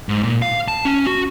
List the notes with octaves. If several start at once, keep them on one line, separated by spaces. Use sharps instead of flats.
G#2
A#2
F5
A5
C#4
F#4